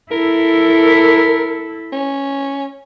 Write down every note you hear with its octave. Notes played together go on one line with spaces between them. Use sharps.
E4 A4 A#4
C#4